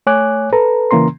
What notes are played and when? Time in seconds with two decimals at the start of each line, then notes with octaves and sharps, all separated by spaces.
0.07 A3 C#5 G#5 D6 F#6
0.53 A4 B4 A#5
0.91 C#3 E3 A#3 C#4 A#5 C6